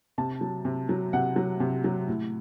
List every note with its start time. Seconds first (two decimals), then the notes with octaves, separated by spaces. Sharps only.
0.18 C3 A5
0.41 F#3
0.65 C3
0.89 F#3
1.13 C3 F#5
1.36 F#3
1.60 C3
1.84 F#3
2.08 A2